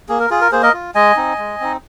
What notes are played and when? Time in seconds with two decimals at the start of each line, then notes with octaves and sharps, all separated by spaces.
0.09 A#3 G#4
0.20 A#4
0.31 F4 G#4
0.41 A#4
0.52 A#3 G#4 C5
0.63 A#4 D#5
0.74 F4
0.95 G#3 D#5 G#5
1.16 C4 D#4
1.38 G#3
1.60 C4 D#4